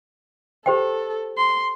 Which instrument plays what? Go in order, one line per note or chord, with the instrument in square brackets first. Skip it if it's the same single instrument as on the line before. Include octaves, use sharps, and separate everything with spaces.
[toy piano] G4 C5 G5 [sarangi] A4
[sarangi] C6